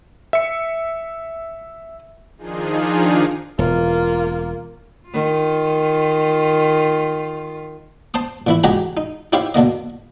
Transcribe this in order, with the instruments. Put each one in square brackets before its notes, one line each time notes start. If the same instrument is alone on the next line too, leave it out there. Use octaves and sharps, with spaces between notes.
[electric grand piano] E5 C#7
[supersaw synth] D#3 F3 D4 D#4 F4 G#4
[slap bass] E1 [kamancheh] A#3 F4
[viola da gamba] D#3 F4
[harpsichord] C5 A5 C6 D#6
A#2 E3 E4
C#2 F#4 G4 D#5 G#5 A#5
D#4
D#4 E4 G4 C5 C#5 F5
B2 D3 A#3 D#5